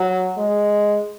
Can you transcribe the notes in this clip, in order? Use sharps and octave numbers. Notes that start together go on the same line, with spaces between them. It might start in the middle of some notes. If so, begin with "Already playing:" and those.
Already playing: F#3
G#3